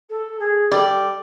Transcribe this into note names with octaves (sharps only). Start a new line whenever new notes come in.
A4
G#4
G3 A4 D5